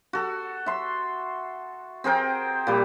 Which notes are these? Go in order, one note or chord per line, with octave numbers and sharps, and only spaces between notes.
F#4 A4
E5 C6
C4 G#4 A#4 G5
A#2 G3